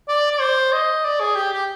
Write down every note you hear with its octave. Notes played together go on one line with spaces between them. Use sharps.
D5
D5
C5
D#5
D5
G#4
G4
G4